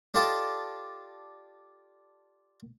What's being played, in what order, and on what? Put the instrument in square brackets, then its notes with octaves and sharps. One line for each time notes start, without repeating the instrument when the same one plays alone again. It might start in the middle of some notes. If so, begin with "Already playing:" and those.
[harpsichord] D4 F4 G4 A4 D#5